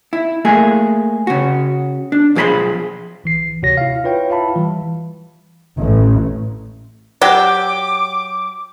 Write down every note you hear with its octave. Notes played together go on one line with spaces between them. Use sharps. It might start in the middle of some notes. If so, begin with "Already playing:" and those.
E4
A3 A#3 G#4
C#3 F#4
D4
B1 F3 G#4 C#5 B5 C6
A#1 E3 C7
D2 C3 F#4 C#5 A#6
E4 F5
E4 F4 B4 C#5 G5
E4 F4 F5 A5 B5
E3 G3
A1
F#3 G4 D6